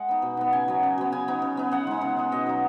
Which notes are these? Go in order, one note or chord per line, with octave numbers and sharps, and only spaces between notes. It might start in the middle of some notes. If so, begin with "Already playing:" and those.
Already playing: G#3 D#5 F#5 G#5
B3 D#4
B2
B3 D#4
C#3 G#5
F#3 B3
C#3
F#3 B3
C#3 G#5
B3 D#4
C#3
B3 D#4
C#3 F#5
G#3 D#4
C#3
G#3 D#4
B2 D#5
F#3 D#4